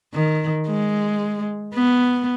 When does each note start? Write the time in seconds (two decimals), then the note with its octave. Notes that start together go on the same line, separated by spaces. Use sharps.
0.14 D#3
0.67 G#3
1.75 B3